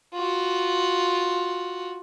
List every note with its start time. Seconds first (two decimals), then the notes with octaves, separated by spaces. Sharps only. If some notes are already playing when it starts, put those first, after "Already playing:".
0.14 F4 F#4